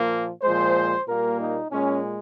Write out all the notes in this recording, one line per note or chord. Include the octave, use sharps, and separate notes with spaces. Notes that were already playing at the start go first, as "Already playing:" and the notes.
Already playing: A#2 F3 A#3
A#2 F3 G#3 C5
A#2 G3 A#3 A#4
D#4
A#2 G#3 C#4